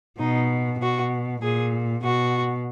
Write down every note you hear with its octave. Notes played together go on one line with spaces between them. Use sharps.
B2 D#4
B2 F#4
A#2 G#4
B2 F#4